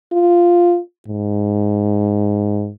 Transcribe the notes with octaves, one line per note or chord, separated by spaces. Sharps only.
F4
G#2